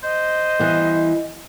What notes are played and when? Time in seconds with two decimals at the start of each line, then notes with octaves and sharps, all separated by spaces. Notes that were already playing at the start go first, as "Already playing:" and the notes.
0.03 C5 D#5
0.59 E3 G3 B3